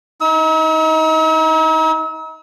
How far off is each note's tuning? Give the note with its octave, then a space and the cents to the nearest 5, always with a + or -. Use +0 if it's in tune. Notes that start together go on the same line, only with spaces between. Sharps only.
D#4 +30 E6 -45